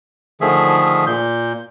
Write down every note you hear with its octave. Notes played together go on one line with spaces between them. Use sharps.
D3 D#3 F3 A3 G#4 E5
A#2 G6